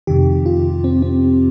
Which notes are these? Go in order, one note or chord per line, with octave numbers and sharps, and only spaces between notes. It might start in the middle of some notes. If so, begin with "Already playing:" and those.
F2 C3 D#3 G4
F4
C4
C4